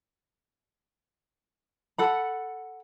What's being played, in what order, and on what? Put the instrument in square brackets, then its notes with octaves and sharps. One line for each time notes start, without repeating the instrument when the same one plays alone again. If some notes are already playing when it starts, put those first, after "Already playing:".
[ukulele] A4 F#5 B5